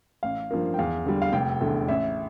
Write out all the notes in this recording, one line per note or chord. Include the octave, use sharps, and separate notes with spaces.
A1 F5
G2 F3 A#3
G5
E2 F5
D3 G3
F5
F1 G5
E2 D3 A3
A1 E5